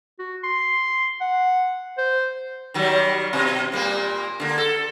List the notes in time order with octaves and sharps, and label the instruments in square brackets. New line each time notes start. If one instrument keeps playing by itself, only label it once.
[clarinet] F#4
C6
F#5
C5
[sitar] D#3 F#3 G3
B2
A#2 G3 A#3
D3 A#3
A4